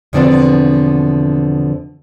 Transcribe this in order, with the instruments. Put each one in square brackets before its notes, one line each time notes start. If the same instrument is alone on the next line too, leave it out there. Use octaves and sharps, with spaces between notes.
[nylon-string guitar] E2 B2 D3 F3 C4 D4